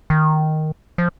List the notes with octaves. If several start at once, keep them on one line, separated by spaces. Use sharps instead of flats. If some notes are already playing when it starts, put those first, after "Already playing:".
D#3
F3